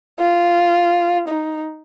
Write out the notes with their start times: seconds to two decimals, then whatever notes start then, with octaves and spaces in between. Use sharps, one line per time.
0.20 F4
1.28 D#4